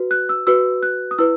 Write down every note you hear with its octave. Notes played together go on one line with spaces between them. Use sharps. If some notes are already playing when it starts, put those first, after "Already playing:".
Already playing: F#4 B4
F#6
E6
F#4 B4 E6
F#6
D#6
E4 B4 E6